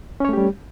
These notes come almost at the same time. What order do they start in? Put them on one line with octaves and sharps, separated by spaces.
C#4 C#5 A3 G4 G3